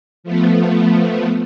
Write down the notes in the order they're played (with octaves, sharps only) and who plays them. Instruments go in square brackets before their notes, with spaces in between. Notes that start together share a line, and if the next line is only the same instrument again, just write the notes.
[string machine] F3 A3 B3